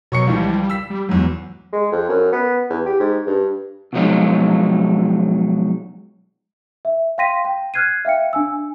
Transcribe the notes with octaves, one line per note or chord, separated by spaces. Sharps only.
B2 F#3 C#6 C#7
C#2 E3 F3 G3
E6 B6
G3
E2 G#2 F#3
G#3
F2
F#2
B3
E2
G4
G#2
G2
B2 D3 F3 F#3 G#3 D#4
E5
F5 G5 C6 A#6 B6 D#7
G5
F6 F#6 G#6 C7 D#7
E5 F5 G5 C#7
D4 G#5 E6